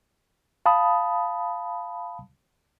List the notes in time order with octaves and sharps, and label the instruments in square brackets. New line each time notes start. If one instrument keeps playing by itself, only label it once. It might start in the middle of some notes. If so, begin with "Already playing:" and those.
[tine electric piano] F5 A5 B5 D#6